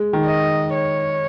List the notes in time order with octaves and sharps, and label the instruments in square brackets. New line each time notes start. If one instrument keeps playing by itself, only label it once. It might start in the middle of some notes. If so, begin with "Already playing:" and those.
Already playing: [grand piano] G#3
D#3
[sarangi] D#5
C#5